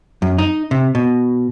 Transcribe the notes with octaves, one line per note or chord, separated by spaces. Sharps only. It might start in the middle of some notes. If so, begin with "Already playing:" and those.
F#2
D#4
C3
B2